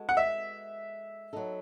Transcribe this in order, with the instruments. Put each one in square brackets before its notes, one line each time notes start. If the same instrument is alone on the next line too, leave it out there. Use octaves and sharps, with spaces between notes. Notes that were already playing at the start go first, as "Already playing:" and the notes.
Already playing: [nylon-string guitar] G#3 B3 F#4 A4
[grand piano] F#5
E5
[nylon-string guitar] F#3 B3 D#4 A4